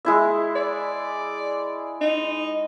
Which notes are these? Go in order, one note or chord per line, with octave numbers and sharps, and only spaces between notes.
G#3 E4 E5
D5
D#4